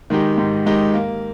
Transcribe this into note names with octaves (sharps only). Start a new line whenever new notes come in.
D#3 G#3 D#4 G4
G#2
D#3 G#3 D#4 G4
A#3